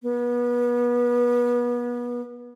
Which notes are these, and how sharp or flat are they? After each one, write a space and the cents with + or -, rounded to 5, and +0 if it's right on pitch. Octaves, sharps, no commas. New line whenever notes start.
B3 -30